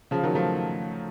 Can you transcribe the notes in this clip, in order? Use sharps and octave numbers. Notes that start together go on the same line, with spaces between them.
C#3 F3
D#3 F#3
F3 A3